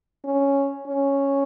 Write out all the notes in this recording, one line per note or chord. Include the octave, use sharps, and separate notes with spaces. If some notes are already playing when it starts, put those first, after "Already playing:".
C#4
C#4